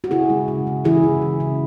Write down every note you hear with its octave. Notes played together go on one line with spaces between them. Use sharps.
F#4
C#3 E4 G#4
G#3
C#3
C#3
E3 E4 G#4
C#3
C#3
C#3